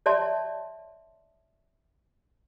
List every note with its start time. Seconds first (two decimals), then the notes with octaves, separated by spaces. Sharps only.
0.06 C#5 D5 E5 A5 C6